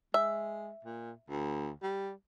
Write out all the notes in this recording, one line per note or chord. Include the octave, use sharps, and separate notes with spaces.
G#3 E5
A#2
D2
G3